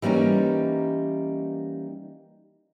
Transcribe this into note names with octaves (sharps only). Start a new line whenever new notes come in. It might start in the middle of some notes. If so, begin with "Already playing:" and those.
E3 G3 A#3 C#4 D#4